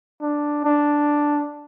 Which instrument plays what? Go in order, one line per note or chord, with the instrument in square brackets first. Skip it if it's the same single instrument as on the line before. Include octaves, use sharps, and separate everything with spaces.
[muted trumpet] D4
D4